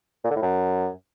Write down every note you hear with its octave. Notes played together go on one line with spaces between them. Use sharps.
A#2
D3
A2
F#2